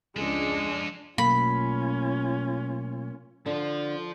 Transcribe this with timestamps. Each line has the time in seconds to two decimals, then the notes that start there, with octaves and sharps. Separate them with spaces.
0.16 C#2 F3 G#3 D4 A4
1.18 B2 F#3 A3 A#3 C#4 F4 B5
3.46 D3 F3